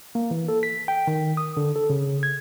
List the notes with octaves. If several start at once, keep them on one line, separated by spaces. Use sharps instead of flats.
A#3
E3
A4
B6
G5
D#3
D#6
D3
A4
C#3
G#6